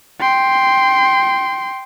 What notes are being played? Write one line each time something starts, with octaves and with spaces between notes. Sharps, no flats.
G5 C6